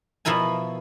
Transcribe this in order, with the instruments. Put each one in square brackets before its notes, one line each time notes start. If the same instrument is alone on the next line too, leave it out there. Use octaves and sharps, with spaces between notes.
[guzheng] B2 F3 E4 A#4 G#5